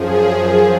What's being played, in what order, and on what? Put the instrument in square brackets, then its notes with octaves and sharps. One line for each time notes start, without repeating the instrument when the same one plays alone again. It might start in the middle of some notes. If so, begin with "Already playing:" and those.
Already playing: [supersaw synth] F#2 F3 G#4
G#4